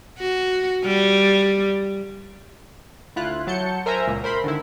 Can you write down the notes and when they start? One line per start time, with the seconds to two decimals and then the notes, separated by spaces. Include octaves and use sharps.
0.19 F#4
0.85 G3
3.16 D2 E4 F4 F#6
3.47 F#3 A5 G6 C#7
3.86 A#4 C5 E5 G#5 A#5
4.06 C#2 A#2
4.24 A#4 C5 B5 C6
4.44 D3 D#3 E4